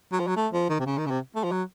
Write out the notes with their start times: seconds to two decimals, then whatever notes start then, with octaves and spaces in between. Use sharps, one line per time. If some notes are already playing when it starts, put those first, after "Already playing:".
0.12 F#3
0.19 F3
0.27 F#3
0.36 A3
0.53 F3
0.69 D#3
0.80 C3
0.86 C#3
0.98 D#3
1.06 C#3
1.10 C3
1.35 A3
1.44 F3
1.51 F#3